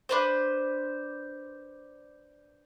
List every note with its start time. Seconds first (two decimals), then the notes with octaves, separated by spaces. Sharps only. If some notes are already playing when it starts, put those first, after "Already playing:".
0.09 D4 B4 C5